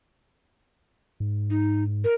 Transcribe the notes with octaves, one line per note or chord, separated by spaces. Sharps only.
G#2
D#4
A#4